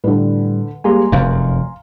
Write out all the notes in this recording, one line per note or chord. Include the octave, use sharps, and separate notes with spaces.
A2 D3 G3 B4
G3 G#3 A#3 G#5 A#5 C6
F1 F#2 F5